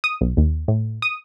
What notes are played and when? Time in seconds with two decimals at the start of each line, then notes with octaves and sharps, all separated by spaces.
0.04 D#6
0.21 B1
0.37 D#2
0.68 A2
1.02 D#6